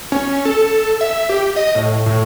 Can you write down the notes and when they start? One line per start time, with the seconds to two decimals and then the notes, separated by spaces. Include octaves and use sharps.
0.12 C#4
0.45 A4
1.01 E5
1.29 G4
1.56 D#5
1.75 A2
2.06 A2